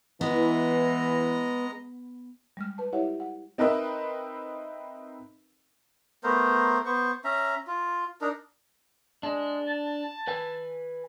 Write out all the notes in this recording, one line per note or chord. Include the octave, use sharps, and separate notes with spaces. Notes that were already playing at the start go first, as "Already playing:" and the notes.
E3 G#3 B3 D#5 A#5
G3 G#3 F6
B4 A5
E4 G4 C#5 E5 F#5
F#5
C4 D#4 A#4 B4 D#5 E5
A3 B3 A#4 C5
B3 C5 C#6
C#4 E5 A#5
F4
D4 D#4 A#4
G#3 D4
A5
B4 G#5